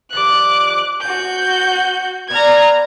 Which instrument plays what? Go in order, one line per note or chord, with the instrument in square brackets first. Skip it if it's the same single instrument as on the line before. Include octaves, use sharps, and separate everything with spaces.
[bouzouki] D#3 F3 G3 [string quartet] D6 F#6
[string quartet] F#4 G6 [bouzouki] G#5
[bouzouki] B3 B4 D5 [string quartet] A#5 F6 G#6